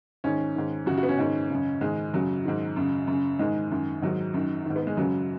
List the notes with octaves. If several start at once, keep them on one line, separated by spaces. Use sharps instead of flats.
G#2 D#3 C#4
G#2 D#3
F#2 C#3 F#4
F#4
B3
C#4
G#2 D#3
F#2 C#3
G#2 D#3 G#3
F#2 C#3 F#3
G#2 D#3
F#2 C#3
F#2 C#3
G#2 D#3 G#3
F#2 D#3
G#2 D#3 F#3
F#2 D#3
G#2 D#3
B3
G#3
F#2 C#3 F#3